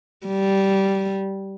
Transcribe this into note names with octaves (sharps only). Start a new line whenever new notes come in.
G3